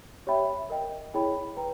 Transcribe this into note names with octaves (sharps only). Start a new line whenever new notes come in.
G4 C#5 E5 G5 B5
A#4 D#5 G5
E4 G#4 C#5 G5 B5
B4 G5 A#5